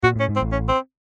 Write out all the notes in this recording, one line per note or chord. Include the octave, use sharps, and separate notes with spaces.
A#2 F#4
A2 C#4
G#2
C4
A1 A2
C#4
C4